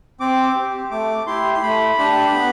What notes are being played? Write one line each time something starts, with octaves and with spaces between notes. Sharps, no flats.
C4 D6
G4
A3 D6
E4 G4 C6
C6
A3 B5
D4 G4
B3